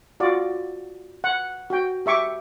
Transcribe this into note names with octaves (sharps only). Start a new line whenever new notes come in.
F4 F#4 D5
F#5
F#4 G5
G4 E5 C#6 D6